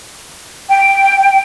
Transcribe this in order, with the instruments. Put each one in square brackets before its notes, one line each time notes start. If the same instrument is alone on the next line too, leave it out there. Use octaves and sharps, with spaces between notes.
[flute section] G5